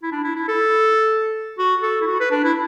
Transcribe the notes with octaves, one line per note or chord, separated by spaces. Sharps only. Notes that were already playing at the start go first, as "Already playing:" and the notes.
E4
D4
E4
E4
A4
F#4
A4
E4
F#4
B4
D4
E4